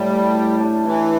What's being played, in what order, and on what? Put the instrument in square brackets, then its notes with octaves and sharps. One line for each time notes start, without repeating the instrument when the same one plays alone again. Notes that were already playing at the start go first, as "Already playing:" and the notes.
Already playing: [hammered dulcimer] A2 [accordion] G3
[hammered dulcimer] A3
G4
D4
[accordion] E3 [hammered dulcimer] E4